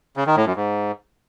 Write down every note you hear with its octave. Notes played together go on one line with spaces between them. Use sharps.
C#3
D#3
A2
F#2
G#2